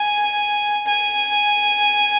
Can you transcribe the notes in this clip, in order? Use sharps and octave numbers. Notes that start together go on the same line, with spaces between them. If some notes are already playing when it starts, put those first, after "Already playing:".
Already playing: G#5
G#5